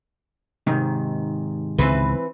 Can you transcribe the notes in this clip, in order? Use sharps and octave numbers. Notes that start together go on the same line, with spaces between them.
G#2 C3 D#3
C#2 C#3 E3 C4 B4